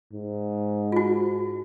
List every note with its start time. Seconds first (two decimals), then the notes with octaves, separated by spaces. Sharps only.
0.13 G#2
0.92 F4 F#4